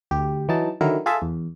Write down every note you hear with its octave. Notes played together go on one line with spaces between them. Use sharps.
D2 G4
E3 F#3 D#4 A5
D3 D#3 F#3 E4 A#4
F4 G#4 A4 E5 A5
E2